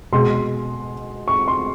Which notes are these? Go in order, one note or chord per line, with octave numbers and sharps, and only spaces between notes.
B2 G#3 C6
C#6
C6